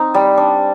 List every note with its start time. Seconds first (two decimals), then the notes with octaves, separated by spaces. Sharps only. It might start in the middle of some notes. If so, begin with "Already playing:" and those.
Already playing: C4 D#4
0.14 G3
0.38 D4